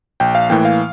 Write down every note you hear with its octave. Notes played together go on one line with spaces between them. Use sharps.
A#1 G5
F5
A2 E3 A#3 G5
F5